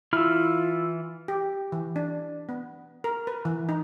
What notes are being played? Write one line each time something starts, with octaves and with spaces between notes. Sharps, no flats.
E3 E4 F4 B5 E6 F6
G4
E3
D4
B3
A#4
B4
E3
D#4